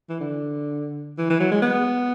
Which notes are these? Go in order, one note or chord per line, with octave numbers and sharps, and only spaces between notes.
E3
D3
E3
E3
F#3
G#3
B3